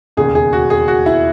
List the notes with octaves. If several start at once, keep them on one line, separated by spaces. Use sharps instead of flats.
E1 D#2 C#3 G#4
G#4
F#4
G#4
F#4
E4